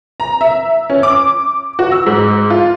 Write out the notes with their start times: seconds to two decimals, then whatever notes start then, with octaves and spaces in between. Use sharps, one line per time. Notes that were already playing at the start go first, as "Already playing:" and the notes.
0.20 A#5
0.41 E5
0.90 C#4
1.03 D6
1.79 F#4
1.92 E6
2.06 G#2
2.50 F4